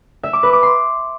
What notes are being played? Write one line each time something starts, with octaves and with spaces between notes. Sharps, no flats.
E5
D6
B4
D6
C6